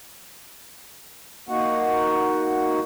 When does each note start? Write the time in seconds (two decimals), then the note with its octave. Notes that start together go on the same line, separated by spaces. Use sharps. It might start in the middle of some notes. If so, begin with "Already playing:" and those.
1.49 A#3 D#4 F#4 F#5